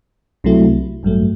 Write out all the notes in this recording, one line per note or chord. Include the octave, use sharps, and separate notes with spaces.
C2 C3 F#3 A3 E4
A1 G2 F#3 A3